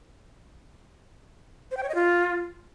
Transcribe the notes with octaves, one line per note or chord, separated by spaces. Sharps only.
C5
G5
C#5
D#5
F4